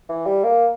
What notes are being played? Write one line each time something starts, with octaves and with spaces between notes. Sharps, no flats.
E3
G3
A#3